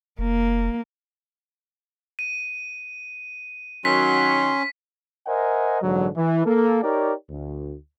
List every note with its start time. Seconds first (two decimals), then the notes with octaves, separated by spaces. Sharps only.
0.19 F1 A#3
2.19 D#7
3.85 D#3 F#3 C#4 C6 B6
5.27 A#4 C5 D#5 E5 F#5 G#5
5.82 A#1 G#2 D3 E3 F#3
6.16 E3
6.46 A#3 A4
6.83 D#4 G4 A#4 C#5 D5
7.29 D2